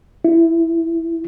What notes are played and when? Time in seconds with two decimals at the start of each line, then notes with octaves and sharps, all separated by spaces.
0.25 E4